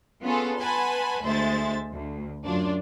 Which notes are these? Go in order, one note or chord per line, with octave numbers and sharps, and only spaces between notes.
B3 C#4 F4 G#4 A4
B4 F#5 G#5 A5 B5 C6
D2 G#3 C5 E5 A6
D2
F#2 D4 F4